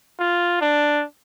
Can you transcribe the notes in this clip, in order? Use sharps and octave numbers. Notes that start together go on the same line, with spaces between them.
F4
D4